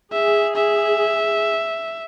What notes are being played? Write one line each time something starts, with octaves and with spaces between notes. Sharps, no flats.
G#4 E5
E5